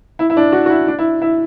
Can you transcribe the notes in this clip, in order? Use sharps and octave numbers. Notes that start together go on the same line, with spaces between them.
E4
E4
D4
F#4
F#4
E4
D4
E4
E4